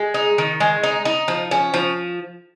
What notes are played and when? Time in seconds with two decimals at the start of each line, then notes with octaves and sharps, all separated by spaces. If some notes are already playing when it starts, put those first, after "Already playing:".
Already playing: G#3
0.14 D#4
0.38 D#3
0.60 G#3
0.83 D#4
1.05 D#4
1.28 F3
1.51 C#4
1.74 F3